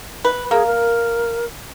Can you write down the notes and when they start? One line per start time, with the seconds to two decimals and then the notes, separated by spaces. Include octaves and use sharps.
0.24 B4
0.51 A#3 G#4
0.67 A#4